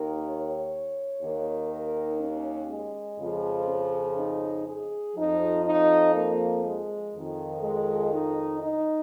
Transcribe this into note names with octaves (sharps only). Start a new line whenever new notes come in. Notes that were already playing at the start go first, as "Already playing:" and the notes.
Already playing: D#2 D#3 A#4
C#5
D#2 D#3
A#4
C#4
G#3
F2 C#3 F3
C#4
D#4
G#4
F2 F3 D#4
D#4
A#3
G#3
F2 D#3
G#3
D#4
D#4